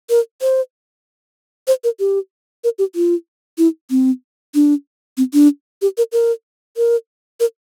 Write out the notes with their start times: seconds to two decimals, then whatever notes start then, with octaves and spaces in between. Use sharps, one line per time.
0.10 A#4
0.42 C5
1.67 C5
1.84 A#4
2.00 G4
2.64 A#4
2.79 G4
2.95 F4
3.58 E4
3.91 C4
4.55 D4
5.17 C4
5.33 D4
5.82 G4
5.98 A#4
6.12 A#4
6.77 A#4
7.40 A#4